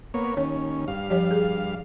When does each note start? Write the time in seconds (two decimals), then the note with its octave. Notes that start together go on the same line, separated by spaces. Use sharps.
0.14 A#3 B3 C#5
0.37 D#2 C#4 C#5
0.88 G2 F5
1.10 F3 G4 C#5
1.31 G#4